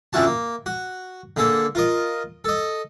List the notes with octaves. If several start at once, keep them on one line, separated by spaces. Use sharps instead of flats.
F2 D3 C#4 E4 F#4 A5
A#3
F#4
D3 A#3 G#4 A4
F4 A#4 D#5
A4 D#5